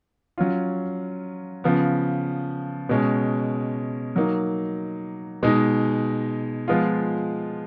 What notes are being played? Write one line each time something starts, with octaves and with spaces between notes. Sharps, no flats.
F#3 C#4 F4
C#3 F3 B3
B2 G#3 C#4
F#3 A#3 D#4
B2 G#3 D#4
F3 G#3 B3 F4